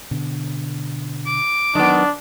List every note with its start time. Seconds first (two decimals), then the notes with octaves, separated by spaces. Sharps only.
0.11 B2 D3
1.26 D6
1.75 D#3 F#3 B3 D4